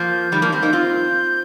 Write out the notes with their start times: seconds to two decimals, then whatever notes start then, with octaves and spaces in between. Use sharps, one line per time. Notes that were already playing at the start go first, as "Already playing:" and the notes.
Already playing: F3 A#3 G6
0.32 D#3 G3
0.42 F3 A#3
0.52 G3 C4
0.62 A#3 D#4
0.73 C4 F4